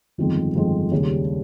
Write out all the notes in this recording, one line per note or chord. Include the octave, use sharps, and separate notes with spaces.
G1 F2 D#3 G#3 C4
G1 F2 D#3 G#3 C4
D#2 C#3 G3